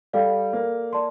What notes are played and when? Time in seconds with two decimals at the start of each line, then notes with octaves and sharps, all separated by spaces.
0.13 G3 A4 D5 F5
0.53 A#3
0.93 D5 A5 C6